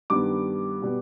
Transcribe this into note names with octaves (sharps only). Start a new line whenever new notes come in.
G2 D#3 G3 B3 D6
B2 G3 B3